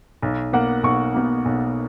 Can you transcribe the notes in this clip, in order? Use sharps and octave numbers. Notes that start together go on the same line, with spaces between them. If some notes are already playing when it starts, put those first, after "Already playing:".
B1
B2 A#3 F#5
B1 C#6
B2 A#3
B1